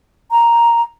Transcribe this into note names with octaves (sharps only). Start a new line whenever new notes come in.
A#5